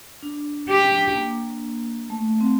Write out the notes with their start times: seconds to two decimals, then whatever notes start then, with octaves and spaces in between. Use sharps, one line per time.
0.23 D4
0.69 G4
1.16 A#3
2.10 A3
2.41 C4